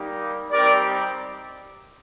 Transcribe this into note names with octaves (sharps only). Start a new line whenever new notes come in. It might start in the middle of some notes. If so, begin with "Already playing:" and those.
Already playing: G3 A#3 D#4 G4
G3 C4 D#4 G4 A#4 D5